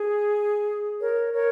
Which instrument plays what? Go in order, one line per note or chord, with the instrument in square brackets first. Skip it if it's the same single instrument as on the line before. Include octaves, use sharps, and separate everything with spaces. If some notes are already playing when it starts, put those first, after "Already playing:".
Already playing: [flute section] G#4
A#4 C#5
A#4 C#5